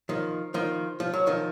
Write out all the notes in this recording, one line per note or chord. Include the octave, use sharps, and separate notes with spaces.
D#3 F3
D#3 F3
F3
F#3
D#3 F3